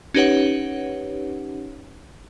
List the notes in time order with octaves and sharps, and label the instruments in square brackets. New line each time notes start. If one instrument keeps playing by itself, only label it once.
[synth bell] C#4 D#4 G4 B4 C#5 F#5